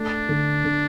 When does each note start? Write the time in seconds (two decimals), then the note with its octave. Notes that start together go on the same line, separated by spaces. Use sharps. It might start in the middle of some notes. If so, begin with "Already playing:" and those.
Already playing: A3 D4
0.29 D3
0.64 D3